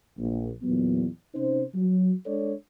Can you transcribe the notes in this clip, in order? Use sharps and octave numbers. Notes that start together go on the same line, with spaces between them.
A#1
E2 A#2 F#3 B3
C3 C#4 D#4 C5
F#3
G#3 D4 A4 C#5 D5